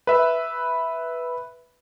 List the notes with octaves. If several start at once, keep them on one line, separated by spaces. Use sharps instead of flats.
B4 E5